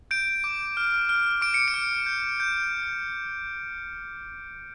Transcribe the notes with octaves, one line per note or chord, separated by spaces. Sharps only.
G6 D7
D6
F6
F6
D6 D7
C#7
D7
F6
G6
G6